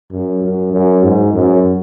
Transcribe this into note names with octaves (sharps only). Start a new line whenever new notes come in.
F#2
F#2
F#2
G#2
F#2